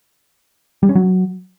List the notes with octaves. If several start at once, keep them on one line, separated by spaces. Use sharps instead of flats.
G3
C#4
F#3